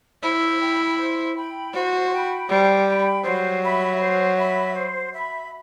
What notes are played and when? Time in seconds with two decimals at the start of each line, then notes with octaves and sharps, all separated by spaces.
0.23 E4 C5
0.61 G5 B5
0.98 C5
1.36 G5 B5
1.74 F#4 C5
2.11 G5 B5
2.49 G3 C5
2.87 G5 B5
3.24 F#3 C5
3.62 E5 B5
4.00 C5
4.37 E5 B5
4.74 C5
5.12 E5 B5